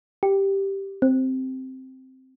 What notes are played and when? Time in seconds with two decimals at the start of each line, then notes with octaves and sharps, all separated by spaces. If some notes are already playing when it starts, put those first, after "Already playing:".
0.23 G4
1.02 C4